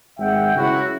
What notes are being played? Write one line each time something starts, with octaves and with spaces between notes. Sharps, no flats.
G#1 G#3 E5 F#5 G5
C#2 F#3 E4 F#4